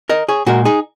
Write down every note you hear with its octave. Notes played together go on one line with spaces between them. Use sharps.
A#4 D#5
G#4 C#5
A#2 G#3 F#4 A#4
D#4 G#4